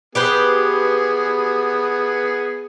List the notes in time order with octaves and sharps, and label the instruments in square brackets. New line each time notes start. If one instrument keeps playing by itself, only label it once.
[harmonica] B3 G#4 [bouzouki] G4 B4 C5